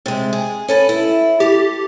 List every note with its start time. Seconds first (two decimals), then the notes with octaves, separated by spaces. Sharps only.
0.06 C3 G#3
0.33 G#4
0.68 C#4 A4 B4
0.89 E4
1.40 G4 A4